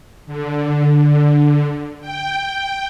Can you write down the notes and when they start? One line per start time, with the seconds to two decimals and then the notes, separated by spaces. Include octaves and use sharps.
0.27 D3
2.01 G5